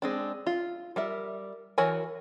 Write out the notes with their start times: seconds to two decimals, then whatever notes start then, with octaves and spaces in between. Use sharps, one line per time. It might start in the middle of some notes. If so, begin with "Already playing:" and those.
0.02 G#3 C4 D4
0.47 F4
0.96 G3 A#4 E5
1.78 E3 F#4 A#4 C#5 G#5